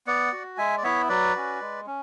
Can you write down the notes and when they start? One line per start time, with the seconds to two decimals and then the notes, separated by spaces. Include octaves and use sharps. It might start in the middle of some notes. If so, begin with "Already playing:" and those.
0.07 B3 D5 F#5
0.32 F#4
0.58 G#3 E5 G#5
0.78 D5
0.83 B3 E4 C#5 E5
1.09 F#3 B4 D5
1.35 C#4 F#4
1.61 G#3
1.86 C#4